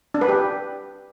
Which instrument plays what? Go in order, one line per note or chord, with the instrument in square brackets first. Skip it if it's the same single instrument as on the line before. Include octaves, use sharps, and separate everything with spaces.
[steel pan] D4
B4
G4